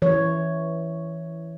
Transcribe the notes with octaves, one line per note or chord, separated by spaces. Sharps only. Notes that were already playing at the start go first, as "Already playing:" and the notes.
E3 C#5